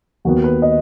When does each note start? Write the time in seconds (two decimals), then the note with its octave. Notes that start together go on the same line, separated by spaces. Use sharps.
0.25 D#2 D#3 B3 F#4
0.44 B4
0.62 D#5